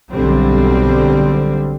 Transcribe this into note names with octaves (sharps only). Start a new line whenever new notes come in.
B1 D3 G3 C4